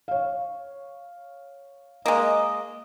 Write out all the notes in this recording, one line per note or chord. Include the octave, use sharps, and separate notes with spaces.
C#5 F5
G#3 A#3 D#5